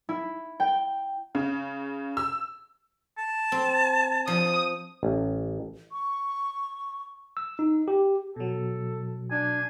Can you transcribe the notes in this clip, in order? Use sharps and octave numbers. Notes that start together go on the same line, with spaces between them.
E4
G5
C#3
E6
A5
C4
F3 D#6
A1
C#6
E6
D#4
G4
B2 F#3 A4
D4 G#5